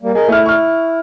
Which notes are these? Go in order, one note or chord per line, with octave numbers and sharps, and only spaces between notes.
G3 A#3
G#4 A#4 D#5
A3 E4 F6
C#6 F6